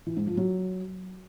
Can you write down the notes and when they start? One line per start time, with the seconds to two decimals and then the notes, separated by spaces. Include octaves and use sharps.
0.06 E3
0.17 G#2
0.27 F3
0.37 F#3